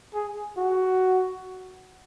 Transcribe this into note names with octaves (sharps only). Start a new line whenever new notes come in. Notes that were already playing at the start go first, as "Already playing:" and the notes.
G#4
F#4